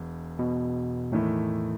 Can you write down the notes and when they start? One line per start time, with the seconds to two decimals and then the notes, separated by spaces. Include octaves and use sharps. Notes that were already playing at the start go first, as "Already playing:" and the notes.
Already playing: E1 E2
0.39 B2
1.12 E2 A2 D#3 A3 E4